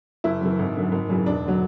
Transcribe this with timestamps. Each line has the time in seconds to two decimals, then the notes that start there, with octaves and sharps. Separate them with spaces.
0.24 F#1 E4
0.41 F#2 E3
0.59 G#1
0.76 F#2 D3
0.92 G#1
1.09 F#2 C#3 E3
1.26 E1 D4
1.46 D3 F#3